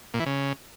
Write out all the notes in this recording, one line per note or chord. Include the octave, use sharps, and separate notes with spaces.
A#2
E3
C#3